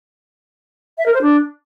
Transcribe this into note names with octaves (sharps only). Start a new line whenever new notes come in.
E5
A#4
C5
D4